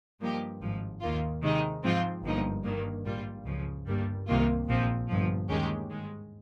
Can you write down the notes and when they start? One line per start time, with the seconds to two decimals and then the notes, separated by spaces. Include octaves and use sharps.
0.20 G2 F3 A#3 D#4 G4
0.61 G#1 G#2 F3
1.01 D#2 D#3 A#3 F4
1.42 C3 D#3 G#3 D#4
1.83 G#2 F3 C4 F4
2.24 G1 G2 F3 A#3 D#4
2.64 G2 D#3 A#3
3.04 A#1 G#2 G3 A#3 F4
3.45 C#2 C#3 F3
3.87 G1 G2 G3 A#3
4.27 C2 C3 D#3 A#3 F4
4.67 A#1 A#2 F3 C4
5.08 G1 G2 F3
5.49 D#2 D#3 G#3 C#4 G4
5.90 G#2 D#3 G#3